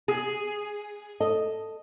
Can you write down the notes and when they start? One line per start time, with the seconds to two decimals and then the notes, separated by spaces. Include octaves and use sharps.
0.08 G#4
1.20 A4 D#5